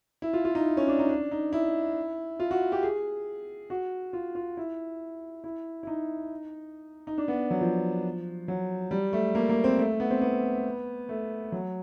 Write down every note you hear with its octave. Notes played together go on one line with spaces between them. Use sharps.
E4
F4
F4
D#4
C#4
D4
D#4
D4
D#4
E4
F4
F#4
G4
G#4
F#4
F4
F4
E4
E4
E4
D#4
D#4
D4
B3
F#3
F3
F#3
G3
A3
A#3
A#3
C4
A3
B3
C4
B3
A3
F#3